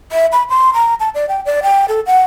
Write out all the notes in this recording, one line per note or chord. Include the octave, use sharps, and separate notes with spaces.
E5
B5
C6
A#5
A5
D5
G5
D5
G5
A4
F#5